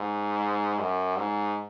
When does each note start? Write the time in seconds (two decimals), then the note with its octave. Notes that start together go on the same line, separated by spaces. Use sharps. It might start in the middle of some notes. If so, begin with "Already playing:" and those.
Already playing: G#2
0.80 F#2
1.18 G#2